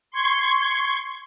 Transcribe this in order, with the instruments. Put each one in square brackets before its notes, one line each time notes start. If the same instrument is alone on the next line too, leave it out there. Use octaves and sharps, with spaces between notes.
[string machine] C6 C#6 G#6